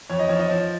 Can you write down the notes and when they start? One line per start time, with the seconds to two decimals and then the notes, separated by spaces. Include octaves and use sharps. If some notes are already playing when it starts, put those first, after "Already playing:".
0.10 F2 C#5
0.19 D#5
0.29 F3 C#5
0.39 D#5
0.50 F3